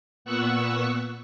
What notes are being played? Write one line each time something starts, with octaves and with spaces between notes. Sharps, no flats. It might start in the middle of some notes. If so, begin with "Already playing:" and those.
A#2 B3 F#5 C#6 E6 F#6